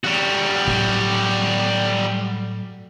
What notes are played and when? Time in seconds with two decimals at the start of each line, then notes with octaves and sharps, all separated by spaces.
0.04 G3 F#4
0.67 A2 F#3